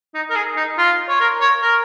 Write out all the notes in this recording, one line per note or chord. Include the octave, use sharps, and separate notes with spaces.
D#4
A#4
G#4
D#4
F4
C#5
A#4
C#5
A#4